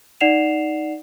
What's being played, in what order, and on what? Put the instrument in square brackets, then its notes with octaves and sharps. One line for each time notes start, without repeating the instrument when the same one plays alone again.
[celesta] D#4 D5 F#5 C7 E7 F7